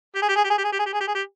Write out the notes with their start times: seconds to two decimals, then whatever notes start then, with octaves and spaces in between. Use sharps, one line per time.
0.15 G4
0.22 G#4
0.29 G4
0.36 G#4
0.44 G4
0.50 G#4
0.58 G4
0.64 G#4
0.72 G4
0.79 G#4
0.86 G4
0.93 G#4
1.00 G4
1.08 G#4
1.14 G4